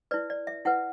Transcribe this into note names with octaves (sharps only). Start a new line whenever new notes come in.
E4 B4 D5
D5
E5
E4 B4 F#5